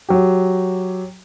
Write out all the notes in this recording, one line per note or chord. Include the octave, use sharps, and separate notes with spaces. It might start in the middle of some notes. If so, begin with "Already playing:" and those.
F#3 G4